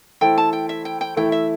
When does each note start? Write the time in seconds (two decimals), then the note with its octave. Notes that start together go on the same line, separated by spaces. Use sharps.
0.21 E3 A3 E4 A4 C5 G5
0.38 A5
0.53 G5
0.69 E5
0.85 G5
1.01 G5
1.17 E3 A3 E4 G5
1.32 E5